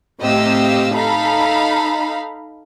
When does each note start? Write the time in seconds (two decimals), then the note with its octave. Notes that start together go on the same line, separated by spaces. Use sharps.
0.22 A2 C3 G4 D#5 F5 E6
0.95 D#4 A4 F5 A#5 B5